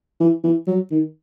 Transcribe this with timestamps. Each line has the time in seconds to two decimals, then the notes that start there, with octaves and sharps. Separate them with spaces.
0.20 E3
0.44 E3
0.67 F#3
0.91 D#3